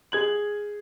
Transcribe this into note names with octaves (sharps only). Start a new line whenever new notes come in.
G#4 G#6 F#7